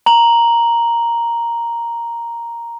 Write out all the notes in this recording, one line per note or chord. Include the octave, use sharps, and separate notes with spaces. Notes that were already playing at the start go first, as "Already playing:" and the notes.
A#5 F#7